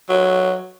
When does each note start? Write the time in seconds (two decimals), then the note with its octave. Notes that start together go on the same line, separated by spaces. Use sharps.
0.09 F#3